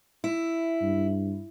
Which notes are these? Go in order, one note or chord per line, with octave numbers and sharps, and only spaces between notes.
E4
G2